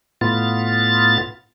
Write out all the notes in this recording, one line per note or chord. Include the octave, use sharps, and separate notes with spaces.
A2 B3 F4 A6